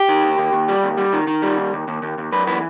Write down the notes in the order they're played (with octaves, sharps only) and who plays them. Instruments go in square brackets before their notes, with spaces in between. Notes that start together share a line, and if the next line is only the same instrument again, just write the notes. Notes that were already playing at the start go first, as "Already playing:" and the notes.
Already playing: [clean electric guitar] G4
D#3
D#2
D#2
D#2
G3
D#2
G3
D#3
D#3
G3
D#2
D#2
D#2
D#2
D#2
F#2 B4
E3 B4